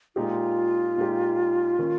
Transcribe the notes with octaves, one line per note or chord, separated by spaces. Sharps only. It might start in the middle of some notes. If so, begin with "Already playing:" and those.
A#2 G#3 D#4 F4 G4
A#2 G#3 D#4 G4
D#3 A#3 C#4